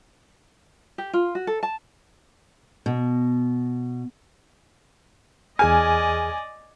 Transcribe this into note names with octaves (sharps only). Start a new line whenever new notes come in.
G4
F4
F#4
A4
A5
B2
E2 G#4 D5 D#5 G#5 F6